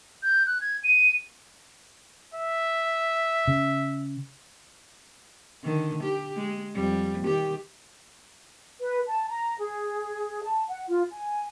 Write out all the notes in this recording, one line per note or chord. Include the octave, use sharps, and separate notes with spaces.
G6
F#6
G#6
D#7
E5
C#3
D3 D#3
G4
G#3
F2 G3
D#3 G4
B4
A5
A#5
G#4
A5
F#5
F4
G#5